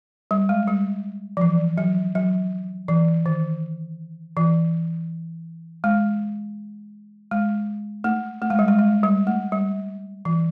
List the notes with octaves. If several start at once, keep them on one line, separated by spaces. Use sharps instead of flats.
G3
G#3
G3
F3
E3
F#3
F#3
E3
D#3
E3
G#3
G#3
A3
A3
G#3
G3
G#3
G#3
G3
A3
G3
E3